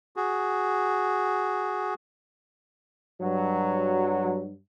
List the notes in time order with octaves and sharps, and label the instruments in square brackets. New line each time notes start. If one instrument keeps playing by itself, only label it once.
[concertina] F#4 G#4
[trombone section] G2 F#3